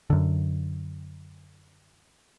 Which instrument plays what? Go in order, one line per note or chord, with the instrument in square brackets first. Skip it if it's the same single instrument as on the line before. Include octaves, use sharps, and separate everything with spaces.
[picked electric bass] F#2 D3